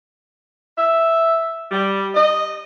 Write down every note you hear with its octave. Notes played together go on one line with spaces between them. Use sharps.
E5
G3
D#5